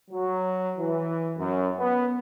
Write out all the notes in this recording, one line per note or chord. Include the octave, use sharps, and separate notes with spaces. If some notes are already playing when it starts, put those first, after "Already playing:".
F#3
E3
F#2
B3